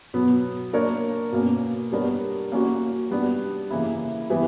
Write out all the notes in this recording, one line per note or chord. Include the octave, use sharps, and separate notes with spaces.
B2 F#3 B3
A#3 D4 A#4 C#5
B2 A#3 C#4
G3 B3 D4 A#4 C#5
A#3 C#4 F#4 C#5
G3 B3 D4
C#3 E3 A#3 E4
E3 G3 B3 E4 B4